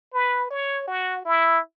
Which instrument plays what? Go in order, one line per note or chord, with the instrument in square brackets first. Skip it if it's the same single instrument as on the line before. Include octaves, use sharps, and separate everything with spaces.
[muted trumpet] B4
C#5
F#4
E4